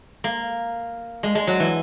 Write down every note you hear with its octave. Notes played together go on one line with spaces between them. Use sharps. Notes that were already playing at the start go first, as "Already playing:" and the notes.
A#3
G#3
G#3
F#3
E3